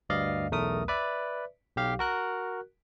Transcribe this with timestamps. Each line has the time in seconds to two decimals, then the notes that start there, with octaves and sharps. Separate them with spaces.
0.09 D2 G2 D5 D#5 F5
0.51 B1 E2 A3 A#4 D#6
0.88 B4 D5 E5
1.77 B1 G4 F5
1.99 F#4 A#4 F#6